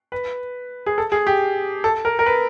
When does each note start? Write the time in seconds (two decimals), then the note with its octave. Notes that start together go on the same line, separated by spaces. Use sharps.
0.12 B4
0.86 G#4
0.98 A4
1.12 G#4
1.27 G4
1.84 A4
2.05 A#4
2.19 A#4
2.26 B4